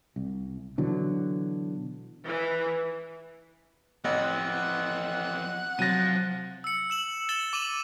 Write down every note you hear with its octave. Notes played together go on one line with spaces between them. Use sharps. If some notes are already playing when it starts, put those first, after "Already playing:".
C2
B2 D3 E3 F#3
E3
A1 F2 E3 F#5
C3 F3 F#3 A6 A#6 D#7
E6 C#7
E6 E7 F#7
A6 C#7 E7 G7
D6 D#7 E7 F#7